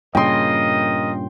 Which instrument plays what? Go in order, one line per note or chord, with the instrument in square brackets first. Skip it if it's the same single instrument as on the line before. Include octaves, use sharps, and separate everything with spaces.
[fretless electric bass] G2 A#2 C#3 [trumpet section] A#4 D#5 [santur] G5 C6